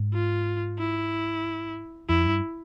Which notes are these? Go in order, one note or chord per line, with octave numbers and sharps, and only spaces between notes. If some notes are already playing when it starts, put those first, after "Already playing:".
Already playing: G#2
F4
E4
F2 E4
G2